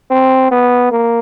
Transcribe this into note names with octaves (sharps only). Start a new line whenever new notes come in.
C4
B3
A#3